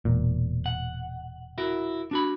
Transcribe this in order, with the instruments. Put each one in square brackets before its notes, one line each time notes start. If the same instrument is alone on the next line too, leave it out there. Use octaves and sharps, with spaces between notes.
[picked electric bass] E1 A#2
[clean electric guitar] F#5
E4 F#4 A#4
D4 F#4 B5